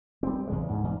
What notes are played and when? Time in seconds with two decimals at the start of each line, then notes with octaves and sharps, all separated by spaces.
0.23 G3 C4
0.47 E2 C#3 G#3
0.68 D2 G#2
0.84 E2 G#2